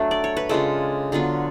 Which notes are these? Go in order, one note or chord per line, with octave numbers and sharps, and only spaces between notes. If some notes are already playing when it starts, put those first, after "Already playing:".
Already playing: F#3 A3 D4
D5
C#5
B4
C#3 G#3 D4 F4 A4
D3 F#3 B3 F4